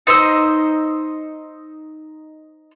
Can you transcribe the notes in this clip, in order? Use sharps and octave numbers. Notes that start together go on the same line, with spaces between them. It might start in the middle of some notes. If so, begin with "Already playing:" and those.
D#4 C5 D#5 E6